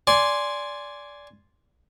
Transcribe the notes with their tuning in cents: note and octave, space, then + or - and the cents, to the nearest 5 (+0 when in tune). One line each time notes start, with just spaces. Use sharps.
D5 -15 G#5 +0 C6 +0